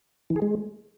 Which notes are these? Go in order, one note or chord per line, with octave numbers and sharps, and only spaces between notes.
E3
G#4
G#3